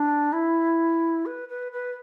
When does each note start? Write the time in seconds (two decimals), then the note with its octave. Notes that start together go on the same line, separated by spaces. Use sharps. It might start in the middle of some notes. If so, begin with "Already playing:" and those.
Already playing: D4
0.33 E4
1.26 B4
1.49 B4
1.72 B4